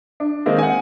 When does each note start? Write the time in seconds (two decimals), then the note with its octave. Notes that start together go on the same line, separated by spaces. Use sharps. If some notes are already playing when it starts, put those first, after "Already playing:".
0.20 D4
0.46 D#3 G#3 A#3 C4
0.59 F#5 G#5